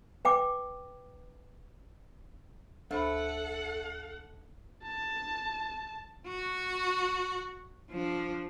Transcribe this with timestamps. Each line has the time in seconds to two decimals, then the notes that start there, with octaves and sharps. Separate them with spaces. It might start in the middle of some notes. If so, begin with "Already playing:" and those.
0.25 B4 G5 D6
2.91 D2 A3 A4 C5 F#5 B5
4.83 A5
6.28 F#4
7.91 F3 D4